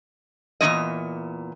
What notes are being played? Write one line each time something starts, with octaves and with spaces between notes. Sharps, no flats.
E2 A#2 D#3 G#3 D#5